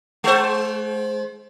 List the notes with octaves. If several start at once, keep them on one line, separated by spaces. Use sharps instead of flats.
G#3 C5